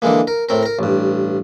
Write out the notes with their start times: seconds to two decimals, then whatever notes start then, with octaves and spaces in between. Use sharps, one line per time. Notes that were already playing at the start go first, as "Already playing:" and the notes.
0.02 D3 E3 G#3 A#3
0.27 A#4
0.49 A2 C4 A#4
0.63 A#4 A#5
0.79 A1 G2